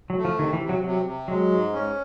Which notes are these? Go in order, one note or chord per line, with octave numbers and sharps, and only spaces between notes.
F#3
A3
F3
C3 D#3
E3
C3
F#3
C3 F#3
C3
F#3 G#3
G#2
C#4